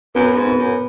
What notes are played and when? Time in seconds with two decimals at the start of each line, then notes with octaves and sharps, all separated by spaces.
0.15 F#2 B3
0.32 F#2
0.36 G#2
0.47 B3
0.58 F#2